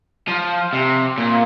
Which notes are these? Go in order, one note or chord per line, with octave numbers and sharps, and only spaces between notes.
F3
C3
A#2